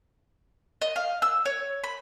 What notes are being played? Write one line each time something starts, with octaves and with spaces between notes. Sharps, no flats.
D#5
F5
E6
C#5
B5